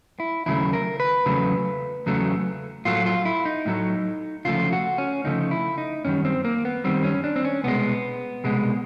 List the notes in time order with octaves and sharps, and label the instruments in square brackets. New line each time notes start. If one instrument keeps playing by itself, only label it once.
[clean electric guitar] E4
D#2 C#3 F#3 A3 E4
A#4
B4
E2 C#3 F#3 A3
E2 C#3 F#3 A3
A2 F#3 A3 F4
F4
E4
D#4
A2 F#3 A3
D2 C#3 F3 A3 F4
F#4
C#4
D2 C#3 F3 A3 D#4
E4
D#4
F#2 D#3 G3 C#4
C4
A#3
B3
F#2 D#3 G3 C4
C#4
D4
C4
C#4
C2 B2 G#3 B3
C2 B2 G#3